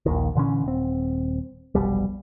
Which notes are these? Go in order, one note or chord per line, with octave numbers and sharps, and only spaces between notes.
A#1 D#2 D#3
A#2 D3 E3 C#4
D#1 C4
F1 B1 B2 G3